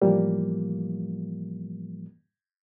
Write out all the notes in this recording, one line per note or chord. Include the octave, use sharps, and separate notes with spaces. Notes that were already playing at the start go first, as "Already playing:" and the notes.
A2 E3 F3 G3 A#3